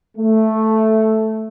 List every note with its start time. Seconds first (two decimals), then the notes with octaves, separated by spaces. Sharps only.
0.17 A3